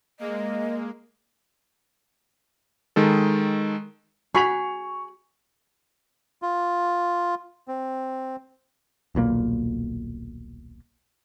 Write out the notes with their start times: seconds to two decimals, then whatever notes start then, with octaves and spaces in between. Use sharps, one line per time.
0.19 G#3 A#3 D#5
2.96 D#3 G#3 A4
4.35 F#4 G#4 B5 C#6 F7
6.42 F4
7.68 C4
9.15 D#1 B1 A#2 A#3